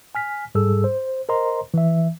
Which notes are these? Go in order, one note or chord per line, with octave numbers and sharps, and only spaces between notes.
G#5 F6 B6
G#2 G3 G#4 A4 E6
C5
A#4 C5 D#5 A#5 C6
E3 E5